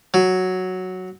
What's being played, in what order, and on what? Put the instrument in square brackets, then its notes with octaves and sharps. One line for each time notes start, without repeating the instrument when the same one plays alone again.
[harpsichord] F#3